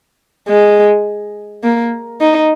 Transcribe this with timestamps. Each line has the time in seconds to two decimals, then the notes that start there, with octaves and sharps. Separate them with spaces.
0.49 G#3
1.63 A#3
2.21 D#4